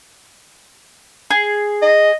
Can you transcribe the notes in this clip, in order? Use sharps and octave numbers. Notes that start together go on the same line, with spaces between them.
G#4
D#5